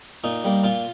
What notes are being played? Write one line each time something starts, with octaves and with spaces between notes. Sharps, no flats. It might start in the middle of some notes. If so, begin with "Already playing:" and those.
A#2 D#4
G3 A#3
A#2 F4